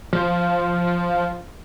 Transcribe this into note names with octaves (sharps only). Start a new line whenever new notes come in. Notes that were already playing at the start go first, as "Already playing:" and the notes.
F3